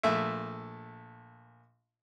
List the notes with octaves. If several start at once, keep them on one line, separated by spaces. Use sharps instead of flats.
A#1 A3 E5